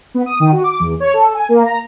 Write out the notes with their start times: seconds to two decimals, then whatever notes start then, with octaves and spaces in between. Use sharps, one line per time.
0.14 B3
0.26 D#6
0.40 D#3
0.52 F#4
0.64 D6
0.79 E2
1.00 C#5
1.13 A4
1.34 G#5
1.49 A#3
1.65 A#5